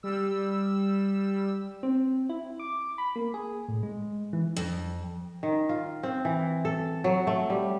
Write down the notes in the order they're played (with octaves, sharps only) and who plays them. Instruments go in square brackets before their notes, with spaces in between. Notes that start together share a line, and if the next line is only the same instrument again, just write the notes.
[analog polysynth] G3 E6
[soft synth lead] C4
E4
D6
B5
A#3
G#4
A2
G#3
E3
[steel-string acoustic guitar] F2
[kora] D#3
F4
C4
E3
A4
F#3
A3
G3